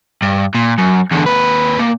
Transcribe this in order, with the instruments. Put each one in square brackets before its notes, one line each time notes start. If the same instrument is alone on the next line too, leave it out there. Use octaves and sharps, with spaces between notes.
[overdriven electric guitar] G2
A#2
F#2
E2 D3
D#2 B4
A#2